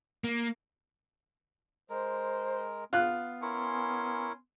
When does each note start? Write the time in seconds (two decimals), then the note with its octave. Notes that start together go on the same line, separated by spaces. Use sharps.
0.24 A#3
1.90 G#3 A#4 C5
2.93 B3 F4 F#6
3.42 C#4 E4 A#4 G#5 C6 C#6